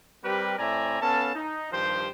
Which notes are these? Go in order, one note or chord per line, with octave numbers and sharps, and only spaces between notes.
G3 C4 G4 A#4 B4
A2 C4 D5 E5 G#5 A#5
B3 C#4 A4 F5 A5
D#4
G2 D#3 F3 G4 C5